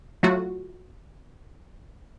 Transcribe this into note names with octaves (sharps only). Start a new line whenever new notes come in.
F#3 A3 F4 F#4